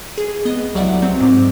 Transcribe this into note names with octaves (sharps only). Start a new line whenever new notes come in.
G#4
B3 D#5
C2 F#3 D5 E5 F#5
F#3 C4
G#2 D6